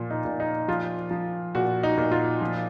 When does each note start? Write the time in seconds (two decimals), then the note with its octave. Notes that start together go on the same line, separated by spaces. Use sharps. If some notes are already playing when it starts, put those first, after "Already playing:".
Already playing: A#2 F3 F4
0.10 D#4
0.25 A#2
0.40 D#4
0.68 F3 F4
1.11 F3
1.55 A#2 F#4
1.83 D#4
1.98 A#2
2.12 F4
2.41 F3